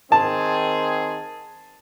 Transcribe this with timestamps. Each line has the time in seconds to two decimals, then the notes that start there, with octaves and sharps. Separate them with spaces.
0.12 D#3 C4 G#4 A5